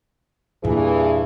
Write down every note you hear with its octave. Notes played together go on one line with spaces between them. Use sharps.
E2 G2 A#2 E3 G#4